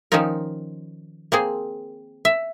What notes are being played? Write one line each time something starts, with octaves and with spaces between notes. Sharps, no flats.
D#3 F3 C#4 D#4 F4 A#4
A#3 C4 G#4
E5